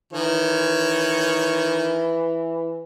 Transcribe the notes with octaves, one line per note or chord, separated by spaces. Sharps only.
D#3 E3 C#5